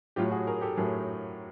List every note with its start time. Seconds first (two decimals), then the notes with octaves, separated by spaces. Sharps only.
0.16 A2 F#3 A3 F4 G4
0.31 F#4 G#4
0.47 G#4 A#4
0.61 G4 A4
0.77 A2 F#3 A3 G#4 A#4